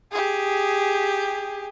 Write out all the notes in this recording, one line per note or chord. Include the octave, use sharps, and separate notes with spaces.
G4 G#4